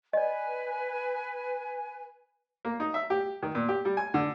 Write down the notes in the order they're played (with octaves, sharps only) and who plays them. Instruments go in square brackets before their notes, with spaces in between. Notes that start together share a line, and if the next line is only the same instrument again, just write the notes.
[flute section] B4 G#5 [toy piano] D5 D#5
[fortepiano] A#3
D#4
E5
G4
D#3
A#2
G4
G3
G#5
D3